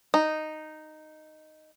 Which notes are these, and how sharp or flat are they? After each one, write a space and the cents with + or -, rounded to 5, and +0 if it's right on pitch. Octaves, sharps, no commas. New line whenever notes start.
D#4 -5